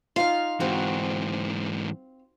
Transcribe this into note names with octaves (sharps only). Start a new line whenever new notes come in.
D#4 F4 F5
G#2 E3 C4 F#4